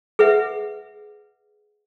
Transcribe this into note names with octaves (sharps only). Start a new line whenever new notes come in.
G#4 B4 E5 F#5